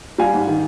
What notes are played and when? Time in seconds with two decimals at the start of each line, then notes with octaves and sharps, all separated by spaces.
0.18 G3 F5 G#5
0.34 G#2
0.48 D#3